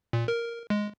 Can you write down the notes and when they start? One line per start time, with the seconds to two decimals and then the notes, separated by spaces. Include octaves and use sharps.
0.13 A#2
0.28 A#4
0.70 G#3